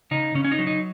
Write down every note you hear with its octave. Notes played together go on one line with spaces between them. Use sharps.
C#3 D#4
C#3 C#4
C#4
D#4
F#3
D#4